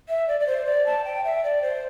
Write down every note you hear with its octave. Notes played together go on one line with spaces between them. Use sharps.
E5
D5
D5
C5
D5
A5
G5
E5
D5
C5